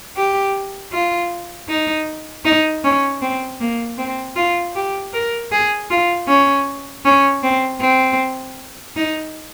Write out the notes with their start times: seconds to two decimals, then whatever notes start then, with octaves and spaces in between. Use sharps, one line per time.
0.16 G4
0.92 F4
1.68 D#4
2.45 D#4
2.84 C#4
3.22 C4
3.60 A#3
3.98 C4
4.36 F4
4.75 G4
5.13 A#4
5.52 G#4
5.90 F4
6.28 C#4
7.05 C#4
7.43 C4
7.81 C4
8.96 D#4